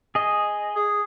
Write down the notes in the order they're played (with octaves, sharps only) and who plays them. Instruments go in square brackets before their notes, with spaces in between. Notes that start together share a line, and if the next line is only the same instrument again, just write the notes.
[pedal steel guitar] G#4 D#5
[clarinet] G#4